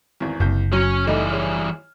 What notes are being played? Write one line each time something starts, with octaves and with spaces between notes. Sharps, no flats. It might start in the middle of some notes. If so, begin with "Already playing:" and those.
G#1 E2
F#1 C2 G6
F#3 C#4 C#5
E3 G3 A3 D#4
G#4 C#5 F6